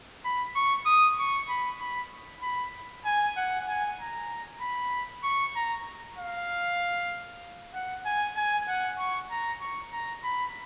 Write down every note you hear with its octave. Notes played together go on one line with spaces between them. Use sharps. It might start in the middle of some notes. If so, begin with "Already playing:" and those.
B5
C#6
D#6
C#6
B5
B5
B5
G#5
F#5
G#5
A#5
B5
C#6
A#5
F5
F#5
G#5
G#5
F#5
C#6
A#5
C#6
A#5
B5